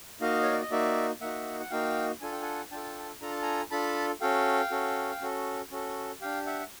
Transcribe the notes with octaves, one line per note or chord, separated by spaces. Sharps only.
A#3 D#4 F#4 D#5 F5
C#5
D5
D#5
A#3 D#4 F#4 D5 E5
A#3 D#4 F#4 E5 F#5
F#5
A#3 D#4 F#4 F5 G5
D4 F4 A4 G#5
G5
F#5 G#5
D4 F4 A4 G5 A5
D4 F4 A4 A#5
A5
G#5 A#5
D4 F4 A4 A5 B5
C#4 F#4 A4 F5 G5
C#4 F#4 A4
C#4 F#4 A4
C#4 F#4 A4
D4 G4 F5 G5
E5 F#5